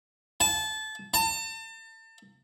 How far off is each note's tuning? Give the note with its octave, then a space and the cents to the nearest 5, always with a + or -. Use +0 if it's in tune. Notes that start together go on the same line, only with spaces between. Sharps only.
A5 -25
A5 +35